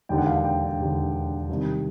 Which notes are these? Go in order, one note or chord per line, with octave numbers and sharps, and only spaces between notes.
E1 D#2 D3 G5
F#5
F5
F#5
G5
E1 D#2 D3
C2 C3 D#3